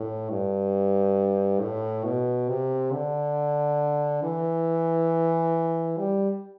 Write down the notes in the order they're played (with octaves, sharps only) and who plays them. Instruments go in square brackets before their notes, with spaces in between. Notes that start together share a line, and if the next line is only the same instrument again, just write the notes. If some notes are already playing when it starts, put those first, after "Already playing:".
Already playing: [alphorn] A2
G2
A2
B2
C3
D3
E3
G3